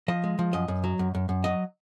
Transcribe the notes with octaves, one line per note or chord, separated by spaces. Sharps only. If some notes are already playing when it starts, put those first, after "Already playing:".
F3 D#5
G#3
F3
F#2 D#5
F#2
F#3
F#2
F#2
F#2
F#3 D#5